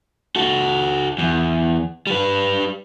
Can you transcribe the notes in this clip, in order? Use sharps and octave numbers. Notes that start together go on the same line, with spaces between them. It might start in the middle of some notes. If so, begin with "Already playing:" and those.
F#4 A4
E2
G3 B4